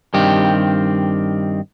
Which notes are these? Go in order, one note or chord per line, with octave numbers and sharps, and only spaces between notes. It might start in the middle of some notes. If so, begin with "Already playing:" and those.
G2 D#3 C4 G4